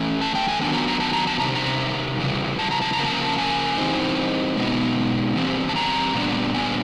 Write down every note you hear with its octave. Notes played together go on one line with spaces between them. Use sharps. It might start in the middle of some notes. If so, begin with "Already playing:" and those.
Already playing: E3 A3 C#4
A5
G5
G#5
D#3 F#3 B3 D4 A5
A#5
A#5
A5
A#5
A5
C3 D#3 G3 A#5
A#5
C#3 E3 G3
A5
A#5
A5
A#5
C#3 F3 A#3
A5
G#5
E3 G3 C4 D#4
B2 G#3 B3 D#4
E3 G3 C4
A5
A#5
A#2 G3 B3 D4
G#5